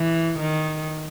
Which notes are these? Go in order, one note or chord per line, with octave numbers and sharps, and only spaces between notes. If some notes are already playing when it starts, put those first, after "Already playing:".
Already playing: E3
D#3